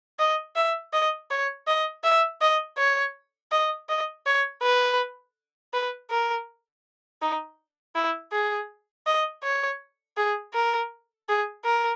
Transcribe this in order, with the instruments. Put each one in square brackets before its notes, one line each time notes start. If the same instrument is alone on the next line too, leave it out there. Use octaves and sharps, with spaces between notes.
[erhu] D#5
E5
D#5
C#5
D#5
E5
D#5
C#5
D#5
D#5
C#5
B4
B4
A#4
D#4
E4
G#4
D#5
C#5
G#4
A#4
G#4
A#4